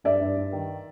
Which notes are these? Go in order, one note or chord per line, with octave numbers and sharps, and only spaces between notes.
G2 D5 E5
G2
G2
D#3